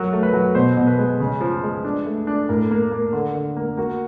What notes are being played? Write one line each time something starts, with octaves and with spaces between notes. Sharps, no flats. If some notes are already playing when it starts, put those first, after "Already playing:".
Already playing: F#3 A#4
A3
B4
F#3
B2 C5
B2
B4
G#3
C#3
F3
G#3
D4
A3
D4
A2 A#4
A#3
A#3
D3
D3
A#3
A#3 F#4